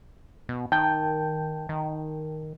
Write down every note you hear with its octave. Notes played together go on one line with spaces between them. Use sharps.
B2
D#3 G5 A5 G6
D#3